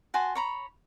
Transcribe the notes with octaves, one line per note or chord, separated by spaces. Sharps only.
F#4 G#5 A5 C6
C#5 A#5 B5